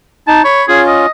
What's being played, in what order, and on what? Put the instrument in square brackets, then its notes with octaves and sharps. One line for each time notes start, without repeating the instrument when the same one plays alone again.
[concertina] D#4 [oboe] A5
[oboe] C#5 [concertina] B5
[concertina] C#4 F4 [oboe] G#4
[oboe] D#5